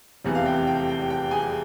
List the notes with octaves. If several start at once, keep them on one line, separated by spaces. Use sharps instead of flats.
F1 E2 C3 E3
F5
G5
G5
G5
G5
G#4 G#5